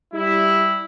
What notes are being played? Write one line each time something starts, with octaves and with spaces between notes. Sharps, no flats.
G3 E4